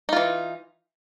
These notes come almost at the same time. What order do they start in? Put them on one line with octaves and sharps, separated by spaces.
D#4 F4 E3